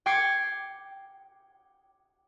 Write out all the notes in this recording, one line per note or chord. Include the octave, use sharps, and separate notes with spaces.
G5 D6 G#6 C7 C#7